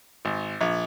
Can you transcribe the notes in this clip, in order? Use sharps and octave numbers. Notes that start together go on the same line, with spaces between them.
G#1
A#1